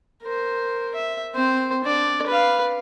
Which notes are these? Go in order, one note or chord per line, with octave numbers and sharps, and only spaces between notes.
A#4 C5
E5
C4 C5
D4 D5
B4 F5